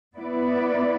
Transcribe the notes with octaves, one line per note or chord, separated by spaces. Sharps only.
B3 E4 B4 D5